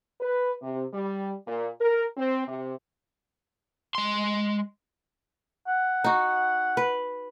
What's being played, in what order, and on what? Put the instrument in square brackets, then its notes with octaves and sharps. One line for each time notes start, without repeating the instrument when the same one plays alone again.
[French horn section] B4
C3
G3
A#2
A#4
C4
C3
[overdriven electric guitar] G#3 C6
[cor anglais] F#5
[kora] D#4 F#4
B4